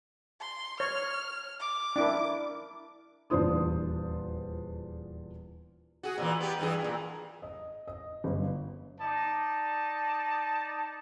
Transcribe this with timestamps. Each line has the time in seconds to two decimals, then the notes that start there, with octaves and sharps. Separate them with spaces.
0.41 C6
0.80 C#5 F6
1.60 D6
1.96 D4 E4 A#4
3.30 D#1 E2 D4 F4 C5 D#6
6.03 F#4 G#4
6.18 A#2 C#3 E3
6.40 B3 G4
6.59 G2 E3 G#4
6.81 F#2 A#2
7.42 D#5
7.87 D#5
8.24 G1
9.01 D#4 D5 A5